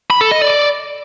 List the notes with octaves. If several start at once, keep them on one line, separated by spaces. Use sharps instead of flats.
B5
A4
D#5
D5